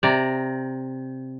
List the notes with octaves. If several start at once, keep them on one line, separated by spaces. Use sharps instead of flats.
C3 D5 A#5